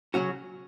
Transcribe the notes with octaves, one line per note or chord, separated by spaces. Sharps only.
C#3 F#3 C#4 F#4